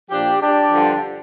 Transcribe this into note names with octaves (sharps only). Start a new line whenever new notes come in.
A#2 F3 D4 G4
D4 G4
G2 D3 F3